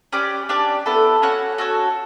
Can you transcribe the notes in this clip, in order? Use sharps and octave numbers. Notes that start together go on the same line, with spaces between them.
C#4 G4 B4 D5
D4 G4 D5
B3 E4 A4
C#4 F#4 C#5 F#5
F#4 A4 C#5